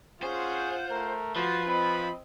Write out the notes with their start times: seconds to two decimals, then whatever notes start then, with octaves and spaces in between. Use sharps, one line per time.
0.23 C#4 F4 G#4 C5 F#5
0.91 A3 A#4
1.36 F3 F#4 B4 C6
1.69 C4 D#5 B5